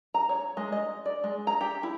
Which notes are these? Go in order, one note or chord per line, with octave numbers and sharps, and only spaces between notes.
A#5
C#5
G#3
D#5
D5
G#3
A#5
G4
E4